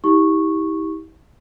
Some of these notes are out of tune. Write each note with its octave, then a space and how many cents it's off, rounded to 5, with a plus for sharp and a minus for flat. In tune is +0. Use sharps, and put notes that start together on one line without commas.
E4 -40 G4 +0 C#6 -10